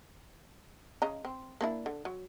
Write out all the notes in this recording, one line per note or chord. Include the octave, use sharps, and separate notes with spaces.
C#3 D#5 A#5
C4
A#3 D4 E4
D3
F#3